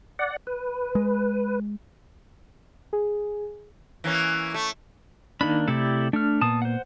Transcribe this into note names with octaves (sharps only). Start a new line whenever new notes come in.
D5 F#5
B4
G#3
G#4
E3 A#3 C#4
A3
D#3 A#3 D4 D#4 B5
C3 A3 E4 G4 A4 D5
A3 D4 F6
A#2 A#3 B3 A5 D#6
C5 F#5